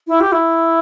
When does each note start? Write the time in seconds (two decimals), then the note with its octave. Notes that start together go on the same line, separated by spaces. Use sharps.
0.07 E4
0.20 G4
0.32 E4